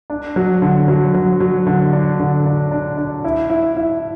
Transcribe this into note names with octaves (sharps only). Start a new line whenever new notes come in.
D4
F#3
D3
F#3
F#3
F#3
D3
D4
D3
D4
D4
D4
E4
E4
E4